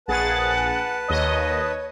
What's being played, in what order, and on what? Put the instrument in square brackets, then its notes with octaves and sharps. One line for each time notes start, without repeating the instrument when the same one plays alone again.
[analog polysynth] A#1 G#4 A6 [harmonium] B4 A5 [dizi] F#5
[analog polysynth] D#2 D#5 [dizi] C#5